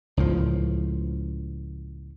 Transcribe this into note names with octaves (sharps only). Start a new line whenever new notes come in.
C#2 A2 F3